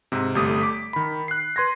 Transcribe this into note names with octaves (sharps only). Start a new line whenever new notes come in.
G#2 C3
G1 G3 A3 G4 D#6
D6 B6
D#3 B5
F#6 C7
B4 C6 G#6 A#6